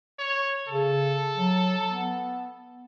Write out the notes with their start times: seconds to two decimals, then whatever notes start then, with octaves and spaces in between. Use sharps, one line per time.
0.19 C#5
0.68 C#3 A4
1.36 F#3
1.90 B3